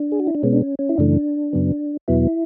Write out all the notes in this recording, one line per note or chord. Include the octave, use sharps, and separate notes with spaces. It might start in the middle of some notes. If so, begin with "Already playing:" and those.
Already playing: D4
G#4
F#4
E4
D4
B2 G#3 B3 C#4
D4
C#4
C#4
E4
F#2 C#3 E3 A3 D4
F#2 C#3 F#3 B3
E2 B2 F#3 B3 E4